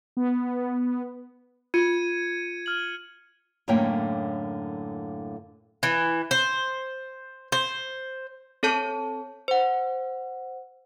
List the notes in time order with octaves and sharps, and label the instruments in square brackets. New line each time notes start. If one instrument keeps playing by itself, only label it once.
[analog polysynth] B3
[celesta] F4 [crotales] G#6 C#7 D#7
[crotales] F6 F#7
[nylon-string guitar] F#2 A2 D3 A#3 C#5 G5
[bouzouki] E3
C5
C5
[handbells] C4 A4 C#5 A5 G6
C5 F#5